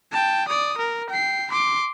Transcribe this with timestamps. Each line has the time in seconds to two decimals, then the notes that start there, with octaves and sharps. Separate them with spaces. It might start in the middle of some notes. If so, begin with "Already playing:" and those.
0.12 G5 A5
0.48 D5 D#6
0.78 A#4
1.10 G5 C7
1.51 C6 D6